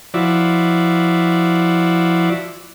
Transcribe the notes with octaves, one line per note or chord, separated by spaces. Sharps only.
F3 E4 F#4 D5